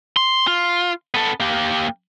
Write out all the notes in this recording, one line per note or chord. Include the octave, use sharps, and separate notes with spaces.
C6
F4
B3 A4
A#3 G4